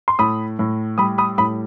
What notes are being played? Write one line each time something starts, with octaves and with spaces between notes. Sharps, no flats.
C6
A2 B5 D#6
A2
G3 B5 D#6
B5 D#6
A2 B5 D#6